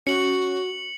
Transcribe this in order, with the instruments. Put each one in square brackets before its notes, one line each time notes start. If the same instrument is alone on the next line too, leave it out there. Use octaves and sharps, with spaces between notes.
[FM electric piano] C#4 [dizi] F#4 [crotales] C#7 F#7